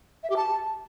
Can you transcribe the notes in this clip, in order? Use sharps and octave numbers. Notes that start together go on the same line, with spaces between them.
E5
G4
A5